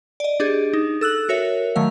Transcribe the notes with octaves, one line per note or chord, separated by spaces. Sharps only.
D5 D#5
D4 G4 G#4
D#4
A4 E6 F#6 F#7
F#4 A#4 C#5 E5
D#3 F#3 A3 F5